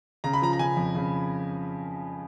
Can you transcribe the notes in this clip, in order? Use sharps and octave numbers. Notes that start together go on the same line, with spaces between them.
C#3 A#5
B5
F3 A#5
A#5
C#3 G#5
F2
C#3